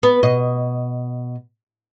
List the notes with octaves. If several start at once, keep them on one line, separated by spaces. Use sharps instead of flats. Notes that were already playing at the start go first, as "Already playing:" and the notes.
B3
B2 D#5